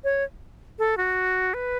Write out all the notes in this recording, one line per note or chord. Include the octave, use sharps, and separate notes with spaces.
C#5
A4
F#4
B4